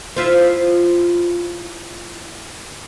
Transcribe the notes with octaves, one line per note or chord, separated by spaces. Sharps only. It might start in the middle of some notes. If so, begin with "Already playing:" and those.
E4 F4 C5